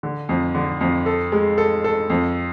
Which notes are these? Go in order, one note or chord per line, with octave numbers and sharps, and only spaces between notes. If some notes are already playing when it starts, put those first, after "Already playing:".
D3
F2
D3
F2
A4
G#3
A4
A4
F2